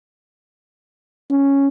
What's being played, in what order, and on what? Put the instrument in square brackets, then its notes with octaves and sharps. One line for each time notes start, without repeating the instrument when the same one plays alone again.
[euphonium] C#4